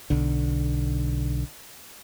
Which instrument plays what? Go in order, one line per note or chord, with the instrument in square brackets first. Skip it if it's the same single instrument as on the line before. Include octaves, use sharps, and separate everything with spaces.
[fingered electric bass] B1 D3